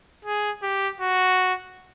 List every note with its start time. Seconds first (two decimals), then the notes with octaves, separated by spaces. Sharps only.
0.24 G#4
0.63 G4
1.01 F#4